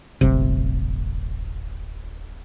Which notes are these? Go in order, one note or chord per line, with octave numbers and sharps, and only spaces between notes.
D1 G1 C3